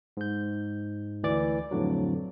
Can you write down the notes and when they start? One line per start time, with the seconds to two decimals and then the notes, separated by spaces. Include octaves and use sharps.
0.17 G#2 G6
1.23 D2 E3 D5 D6
1.71 F2 A2 D3 F#3